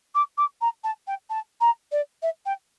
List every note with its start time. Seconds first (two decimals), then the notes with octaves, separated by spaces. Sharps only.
0.14 D6
0.37 D6
0.61 A#5
0.84 A5
1.07 G5
1.29 A5
1.60 A#5
1.91 D5
2.22 E5
2.45 G5